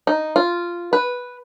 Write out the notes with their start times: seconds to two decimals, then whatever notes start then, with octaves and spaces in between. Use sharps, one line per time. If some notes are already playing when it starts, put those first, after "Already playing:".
0.07 D#4
0.36 F4
0.93 B4